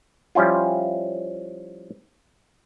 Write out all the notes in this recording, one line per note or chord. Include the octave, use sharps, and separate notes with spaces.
F3 G3 C#4 E4 F4